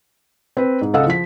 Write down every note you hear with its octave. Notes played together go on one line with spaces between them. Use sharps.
C4 B4
G#2
C#2 A4 D#5 F5 F#5 E6
F3 B6